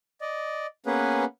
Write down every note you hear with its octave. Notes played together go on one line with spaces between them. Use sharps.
D5 D#5
A#3 B3 C#4 G#4 B4